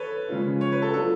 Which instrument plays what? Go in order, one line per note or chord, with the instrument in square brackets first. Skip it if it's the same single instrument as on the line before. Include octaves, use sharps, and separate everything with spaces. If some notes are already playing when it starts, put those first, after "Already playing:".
Already playing: [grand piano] A4 B4 C#5
[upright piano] C#3 F3 G#3 C#4 F4
[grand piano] C#5
B4
A4
[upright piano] F#3 B3 D4 F4 [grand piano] A4